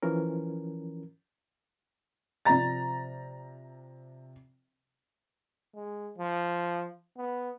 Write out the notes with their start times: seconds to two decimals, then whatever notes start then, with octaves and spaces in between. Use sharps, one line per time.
0.03 E3 F3 C#4 A#4
2.45 C3 F3 D5 A#5 A6
5.75 G#3
6.18 F3
7.17 B3